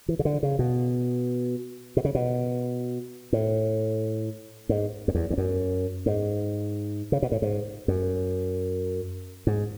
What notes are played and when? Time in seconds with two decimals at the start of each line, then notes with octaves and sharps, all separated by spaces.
0.08 E3
0.19 C#3
0.25 D3
0.43 C#3
0.59 B2
1.97 B2
2.05 C#3
2.15 B2
3.33 A2
4.69 G#2
5.08 F#2
5.15 E2
5.30 E2
5.38 F#2
6.06 G#2
7.12 C#3
7.22 B2
7.32 A2
7.42 G#2
7.88 F#2
9.47 G#2